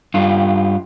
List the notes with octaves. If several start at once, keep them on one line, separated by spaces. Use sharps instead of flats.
G2 F4